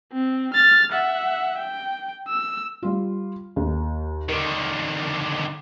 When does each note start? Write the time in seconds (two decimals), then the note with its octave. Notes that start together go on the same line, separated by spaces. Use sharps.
0.13 C4
0.53 F6 A6
0.92 E5 F#5
1.58 G5
2.28 E6
2.82 G3 F4
3.56 D#2
4.29 D3 D#3 A#4